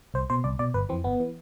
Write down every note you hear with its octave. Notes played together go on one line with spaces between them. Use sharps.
C2 C5
B2 C5
C2 D5
B2 D5
G1 B4
F2 E3 C4
G1 B3
E3